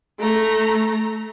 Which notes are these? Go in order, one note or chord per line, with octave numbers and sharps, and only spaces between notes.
A3 A#5